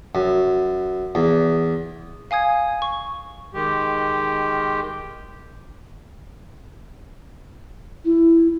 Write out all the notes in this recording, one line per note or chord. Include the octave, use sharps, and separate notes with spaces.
F#2
E2
F5 G#5 D#6 G#6
C#6
D#3 G#3 G4
E4